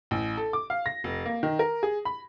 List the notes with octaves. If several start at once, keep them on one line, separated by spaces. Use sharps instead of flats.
A1
A4
D6
F5
A#6
F1
A#3
D#3
A#4
G#4
B5